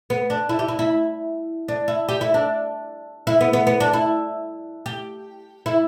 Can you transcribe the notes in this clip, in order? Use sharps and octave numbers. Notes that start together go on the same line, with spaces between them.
B3
D4
E4
G4
E4
E4
D4
E4
G4
E4
D4
E4
B3
B3
B3
D4
E4
G4
E4